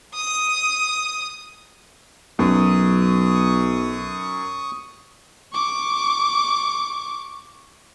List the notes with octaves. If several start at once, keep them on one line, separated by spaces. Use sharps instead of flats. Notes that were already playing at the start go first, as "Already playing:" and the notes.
D#6
B1 F#2 C#6 D#6
C#6 D6